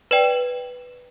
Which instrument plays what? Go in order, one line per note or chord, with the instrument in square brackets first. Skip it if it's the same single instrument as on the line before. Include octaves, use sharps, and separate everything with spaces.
[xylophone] B4 D5 G5 E7